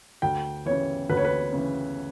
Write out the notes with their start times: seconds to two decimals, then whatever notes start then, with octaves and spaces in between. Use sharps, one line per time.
0.22 D2 G5
0.66 C#3 E3 C#5
1.09 D2 B4
1.17 C#5
1.25 B4
1.53 C#3 E3